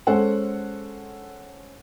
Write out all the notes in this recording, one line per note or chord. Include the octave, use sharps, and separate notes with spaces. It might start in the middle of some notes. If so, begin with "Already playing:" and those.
G#3 C#4 A4 C5 F#5